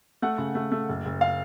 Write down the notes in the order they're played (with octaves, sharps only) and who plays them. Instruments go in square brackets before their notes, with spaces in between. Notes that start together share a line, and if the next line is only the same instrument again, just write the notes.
[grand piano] A3 F#5
C#3
A3
A3
F#1
F#1
F5